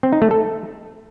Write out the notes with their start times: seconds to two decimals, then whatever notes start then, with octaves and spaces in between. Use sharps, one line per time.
0.03 C4
0.12 D#4
0.22 A3
0.31 A4